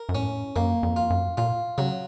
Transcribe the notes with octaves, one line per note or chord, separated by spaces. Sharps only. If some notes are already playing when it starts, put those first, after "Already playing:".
Already playing: A#4
F#2
A2 C#4
F#2 A#3
F2
F4
F#2
A#2 F4
C#3 F#3